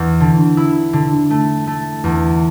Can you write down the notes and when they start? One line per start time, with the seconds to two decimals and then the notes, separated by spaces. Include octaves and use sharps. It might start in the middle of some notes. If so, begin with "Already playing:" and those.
Already playing: E2
0.20 D3
0.57 E4
0.93 D3
1.30 A3
1.67 A3
2.04 E2